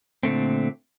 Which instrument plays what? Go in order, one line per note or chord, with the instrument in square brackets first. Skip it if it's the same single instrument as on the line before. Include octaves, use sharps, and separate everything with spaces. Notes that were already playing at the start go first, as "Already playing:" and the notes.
[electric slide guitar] A#2 D3 A3 C4